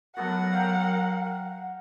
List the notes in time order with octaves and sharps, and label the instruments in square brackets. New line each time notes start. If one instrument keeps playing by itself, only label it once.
[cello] F#3 [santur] A3 B3 F#4 [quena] A#4 [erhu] F#5
[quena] A#4 [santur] F5 G5 A#5
[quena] F#5